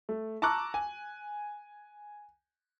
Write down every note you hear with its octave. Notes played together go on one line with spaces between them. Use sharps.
A3
A5 A#5 C#6 D6 E6 F#6
G#5